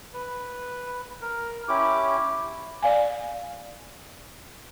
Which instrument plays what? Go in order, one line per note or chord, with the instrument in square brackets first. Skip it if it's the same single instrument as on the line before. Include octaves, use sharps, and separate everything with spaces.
[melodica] B4
A#4
C#4 E4 G4 D6
[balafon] D5 F5 G#5